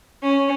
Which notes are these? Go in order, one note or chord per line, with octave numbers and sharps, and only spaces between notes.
C#4